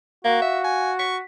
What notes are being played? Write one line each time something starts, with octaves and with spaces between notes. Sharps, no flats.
A#3 F#4 F5
E5
G#5
C#6 B6